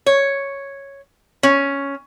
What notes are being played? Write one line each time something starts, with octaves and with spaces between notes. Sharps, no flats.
C#5
C#4